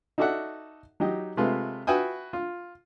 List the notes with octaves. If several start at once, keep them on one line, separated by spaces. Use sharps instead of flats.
D#4 F#4 A4 D5 E5 F#5
F#3 D#4 G4 D#5
C3 G#3 A3 F4 B4
F#4 B4 E5 G5 G#5 D#6
F4